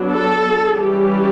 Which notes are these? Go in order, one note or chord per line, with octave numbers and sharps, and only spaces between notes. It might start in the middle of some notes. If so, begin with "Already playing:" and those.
Already playing: F#3 B3 D4
A4
E3 G3 C#4 G4